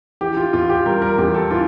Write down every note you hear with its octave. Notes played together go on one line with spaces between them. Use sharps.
E3 G4
F4
E2 F4
G4
G3 A#4
A#4
E2 G4
A4
E3 F4